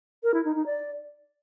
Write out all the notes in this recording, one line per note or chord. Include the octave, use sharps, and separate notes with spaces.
A#4
E4
D#4
D#4
D5